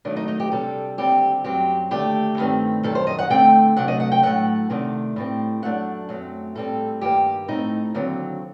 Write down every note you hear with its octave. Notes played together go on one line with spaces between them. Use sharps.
D#2 D#3 F#3 A3 D4
D#4
D#4
G4
C3 G3 D4 A4
D#2 D3 G3 C4 G4
F#2 F#3 C4 G4
D#2 D3 A3 D4 G4
G2 D#3 A3 C4
F#2 D#3 G3 A4
C5
D#5
F#5
D2 D3 A3 C4 G5
C3 F#3 A3 D4 F#5
D#5
F#5
G5
A2 F#3 A3 F#5
C3 D#3 A3 D4
A2 G3 C4
F#2 F#3 A3 D4 F#5
F#2 F#3 A3 C4
A2 G3 C4 A4
G2 D#3 G3 A#3 G4
A2 A3 C4 D#4
D#2 D3 F#3 C4